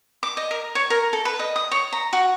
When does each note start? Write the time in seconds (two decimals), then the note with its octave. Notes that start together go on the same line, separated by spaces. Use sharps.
0.23 D6
0.37 D#5
0.51 A#4
0.75 C#5
0.90 A#4
1.13 A4
1.25 B4
1.39 D#5
1.56 D#6
1.71 C#5
1.93 A#5
2.13 F#4